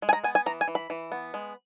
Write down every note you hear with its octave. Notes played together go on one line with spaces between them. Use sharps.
G#3
G#5
A#5
B3 G#5
G#5
E3 A#5
G#5
E3
B5
E3
B3
G#3